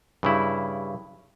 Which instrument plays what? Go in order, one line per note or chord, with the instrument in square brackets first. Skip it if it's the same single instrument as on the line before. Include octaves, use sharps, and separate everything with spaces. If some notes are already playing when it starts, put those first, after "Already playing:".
[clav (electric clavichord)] G2 C#3 E4